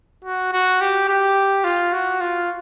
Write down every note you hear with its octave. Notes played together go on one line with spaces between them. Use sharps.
F#4
F#4
G4
G4
F4
F#4
F4